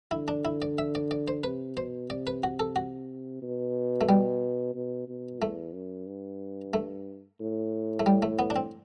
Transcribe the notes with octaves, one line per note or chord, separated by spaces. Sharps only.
D3 E4
D4
E4
D5
E5
D5
D5
C5
C3 B4
B2 C5
C3 D5
B4
F#4
A4
F#4
B2
A3
G3
B2
B2
E2 A3
F#2
G2
A3
A2
A3
G3
A3
B3
D4
C4